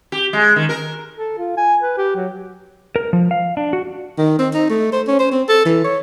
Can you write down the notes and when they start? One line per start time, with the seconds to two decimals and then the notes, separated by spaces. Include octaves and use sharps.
0.12 G4
0.33 G#3
0.56 D#3
0.69 A#4
1.16 A4
1.38 F4
1.57 G#5
1.81 B4
1.98 G4
2.16 F#3
2.96 A#4
3.13 F3
3.31 F5
3.57 D4
3.73 F#4
4.18 D#3
4.39 C4
4.54 D#4
4.70 A3
4.92 C5
5.07 C#4
5.19 C5
5.31 C4
5.49 A4
5.65 E3
5.84 C#5